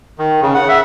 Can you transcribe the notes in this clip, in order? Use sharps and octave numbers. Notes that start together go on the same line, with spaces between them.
D#3
C#3
F#5
E5